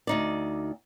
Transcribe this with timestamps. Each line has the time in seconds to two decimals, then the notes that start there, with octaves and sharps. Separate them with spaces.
0.07 D2 D#4 D5